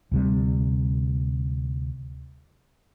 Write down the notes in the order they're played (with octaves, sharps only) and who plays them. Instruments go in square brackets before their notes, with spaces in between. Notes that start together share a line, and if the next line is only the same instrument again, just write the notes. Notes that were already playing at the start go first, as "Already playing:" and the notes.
[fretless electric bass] D2 C3 G3